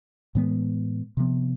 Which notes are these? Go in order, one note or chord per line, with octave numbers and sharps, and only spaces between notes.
A2 E3 G#3 B3
C3 F3 B3